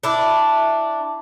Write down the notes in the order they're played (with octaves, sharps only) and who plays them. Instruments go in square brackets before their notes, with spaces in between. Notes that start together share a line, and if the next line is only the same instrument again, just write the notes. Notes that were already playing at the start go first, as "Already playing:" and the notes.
[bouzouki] D4 E4